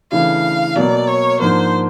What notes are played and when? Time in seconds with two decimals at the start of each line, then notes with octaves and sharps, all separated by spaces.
0.12 C#3 E3 A3 D4 F5
0.76 B2 F#3 A#3 D5
1.08 C#5
1.39 G#2 F3 A#3 D4 C5